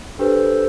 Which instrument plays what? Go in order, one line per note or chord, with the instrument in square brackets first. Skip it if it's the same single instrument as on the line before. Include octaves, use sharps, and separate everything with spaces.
[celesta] D4 G4 B4 [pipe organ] A4 C5